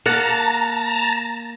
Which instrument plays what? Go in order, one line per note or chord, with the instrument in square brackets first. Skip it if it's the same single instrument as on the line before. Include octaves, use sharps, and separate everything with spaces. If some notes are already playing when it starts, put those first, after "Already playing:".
[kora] A#3 F#5 [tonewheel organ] A5 A#5